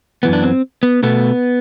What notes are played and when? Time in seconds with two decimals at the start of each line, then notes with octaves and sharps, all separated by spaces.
0.23 F#2 E3 B3
0.33 D4
0.43 C4
0.83 B3
1.03 B2 A3 B3